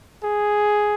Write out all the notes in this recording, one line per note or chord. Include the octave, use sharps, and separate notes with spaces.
G#4